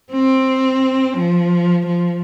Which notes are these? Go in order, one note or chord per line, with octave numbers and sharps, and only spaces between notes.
C4
F3
F3